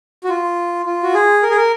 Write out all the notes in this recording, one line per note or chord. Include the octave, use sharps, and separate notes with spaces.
F#4
F4
F4
F#4
G#4
A#4
G#4
A#4